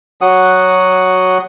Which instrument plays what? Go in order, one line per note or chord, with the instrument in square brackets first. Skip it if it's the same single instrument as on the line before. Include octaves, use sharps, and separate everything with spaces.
[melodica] F#3 F#4 F#5 D#6